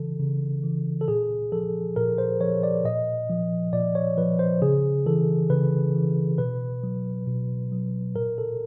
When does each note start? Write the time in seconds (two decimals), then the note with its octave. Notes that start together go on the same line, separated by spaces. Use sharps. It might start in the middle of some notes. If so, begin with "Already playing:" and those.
Already playing: C#3 E3 A4
0.19 C#3
0.63 E3
1.01 A4
1.08 A#2 G#4
1.52 F3 A4
1.96 A#2 A#4
2.18 C5
2.41 F3 C#5
2.63 D5
2.85 A#2 D#5
3.30 F3
3.73 A#2 D5
3.95 C#5
4.17 F3 B4
4.39 C5
4.62 C#3 G#4
5.06 E3 A4
5.50 C#3 B4
5.95 E3
6.38 B2 B4
6.84 F#3
7.27 B2
7.72 F#3
8.16 A#2 A#4
8.38 A4